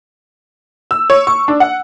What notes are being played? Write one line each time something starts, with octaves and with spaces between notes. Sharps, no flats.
E6
C#5
C#6
D4
F#5